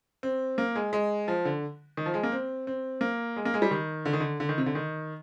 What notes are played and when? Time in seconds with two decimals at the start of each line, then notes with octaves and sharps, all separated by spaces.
0.23 C4
0.58 A#3
0.75 G#3
0.93 G#3
1.28 F3
1.45 D3
1.97 D#3
2.06 F3
2.14 G#3
2.23 A#3
2.32 C4
2.67 C4
3.01 A#3
3.36 G#3
3.45 A#3
3.54 G#3
3.62 G3
3.71 D#3
4.05 D3
4.13 D#3
4.20 D3
4.40 D3
4.49 D#3
4.58 C3
4.66 D3
4.75 D#3